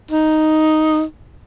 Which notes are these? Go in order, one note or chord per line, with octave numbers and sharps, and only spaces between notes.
D#4